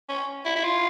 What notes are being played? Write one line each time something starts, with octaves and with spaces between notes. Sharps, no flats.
C#4
E4
E4
F4